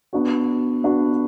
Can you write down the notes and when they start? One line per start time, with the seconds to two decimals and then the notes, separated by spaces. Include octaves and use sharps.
0.13 B3 D4 F#4
0.84 B3 D4 F#4